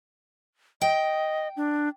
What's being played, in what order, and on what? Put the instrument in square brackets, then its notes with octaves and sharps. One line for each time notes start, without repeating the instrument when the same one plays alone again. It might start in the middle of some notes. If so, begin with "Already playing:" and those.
[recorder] D#5 [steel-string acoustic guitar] G5
[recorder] D4